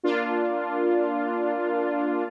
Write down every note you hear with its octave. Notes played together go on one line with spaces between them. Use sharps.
A#3 D4 F4